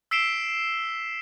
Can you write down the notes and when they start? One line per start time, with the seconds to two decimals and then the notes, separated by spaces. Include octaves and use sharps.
0.11 E6 B6 C7 D7 E7 G7